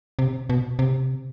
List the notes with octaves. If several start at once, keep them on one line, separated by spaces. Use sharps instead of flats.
C3
B2
C3